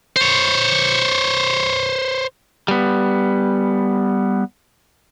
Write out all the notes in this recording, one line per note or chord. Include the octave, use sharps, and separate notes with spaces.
C5 C#5
G3 B3